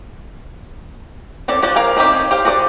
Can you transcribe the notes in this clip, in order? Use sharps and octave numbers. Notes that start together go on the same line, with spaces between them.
C4 C#4 A4 D5
F3 F#4 C5 D5
A#4 F5 G#5
C4 D#4 E4 G4 C#5
G4 C5 F5
F#4 G#4 C5 D5